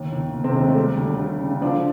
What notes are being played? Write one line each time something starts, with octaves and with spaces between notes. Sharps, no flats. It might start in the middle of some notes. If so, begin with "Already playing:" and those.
Already playing: D#2
D#2
D#2
C3 C4
D#2 G#3
A3
G3
D2
G3
C#3
D3 F3 D4